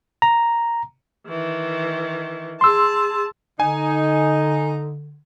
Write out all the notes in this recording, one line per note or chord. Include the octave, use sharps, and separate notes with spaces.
A#5
D#3 E3
G#4 A5 C6 E6
D3 D#4 G#5